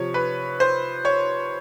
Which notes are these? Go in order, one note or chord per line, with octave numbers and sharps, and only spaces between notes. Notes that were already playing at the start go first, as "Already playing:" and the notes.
Already playing: C3 F3 C#5
B4
C5
C#5